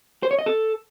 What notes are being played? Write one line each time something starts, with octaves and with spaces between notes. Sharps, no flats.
C5
C#5
D#5
A4